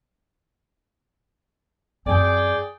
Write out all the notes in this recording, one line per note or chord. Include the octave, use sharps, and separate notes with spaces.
F#2 C4 G#4 D5 G5